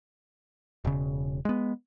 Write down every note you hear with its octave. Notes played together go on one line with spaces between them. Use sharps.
E1 C#3
G#3 B3